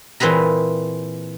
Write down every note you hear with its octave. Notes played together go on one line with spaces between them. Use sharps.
A#2 E3 C4 G#4 B4 A#5